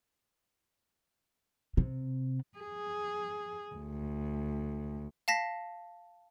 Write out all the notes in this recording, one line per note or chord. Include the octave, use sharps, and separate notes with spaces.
C3
G#4
D2
F5 A5 A#6 B6